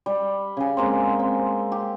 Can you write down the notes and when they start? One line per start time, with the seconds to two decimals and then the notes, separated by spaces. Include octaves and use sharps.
0.06 G3
0.57 C#3 G#5
0.77 G#3 A#3 C4
1.19 C4
1.72 G4